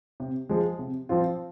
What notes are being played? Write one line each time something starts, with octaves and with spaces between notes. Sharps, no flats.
C3
F3 G#3
C3
F3 C4 F4